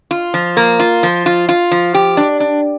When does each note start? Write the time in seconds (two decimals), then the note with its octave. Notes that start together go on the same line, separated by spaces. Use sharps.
0.11 F4
0.34 F3
0.57 A#3
0.80 F4
1.03 F3
1.26 F4
1.49 F4
1.72 F3
1.94 G4
2.17 D4
2.40 D4